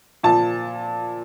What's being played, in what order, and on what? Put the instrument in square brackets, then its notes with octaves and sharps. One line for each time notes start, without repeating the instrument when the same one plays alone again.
[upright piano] A#2 F3 A5